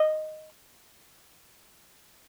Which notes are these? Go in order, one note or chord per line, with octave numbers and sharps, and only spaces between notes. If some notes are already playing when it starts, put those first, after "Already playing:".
Already playing: D#5